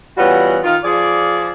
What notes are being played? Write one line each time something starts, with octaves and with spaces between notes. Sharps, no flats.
E3 G3 B3 C#4 F4 F#4
D#3 F4
F3 G#4 D5